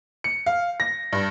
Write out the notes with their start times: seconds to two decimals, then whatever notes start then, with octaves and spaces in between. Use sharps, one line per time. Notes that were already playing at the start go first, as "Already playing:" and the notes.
0.24 C#7
0.46 F5
0.80 A#6
1.13 G2